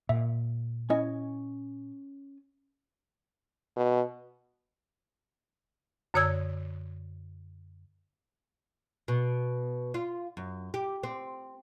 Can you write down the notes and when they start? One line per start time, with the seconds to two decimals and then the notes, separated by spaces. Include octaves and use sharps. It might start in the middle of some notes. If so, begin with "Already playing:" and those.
0.09 A#2 E5
0.90 C#4 E4 D#5 G#5
3.76 B2
6.14 F#2 D3 C#5 D#6 E6 G#6
9.08 B2
9.94 F4
10.37 F#2
10.74 G4
11.03 C4